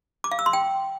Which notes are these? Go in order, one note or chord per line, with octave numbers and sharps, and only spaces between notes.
D6
F5
E6
C6
G5